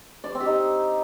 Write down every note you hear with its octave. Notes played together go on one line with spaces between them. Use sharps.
D5
C5
C4
G4
D#4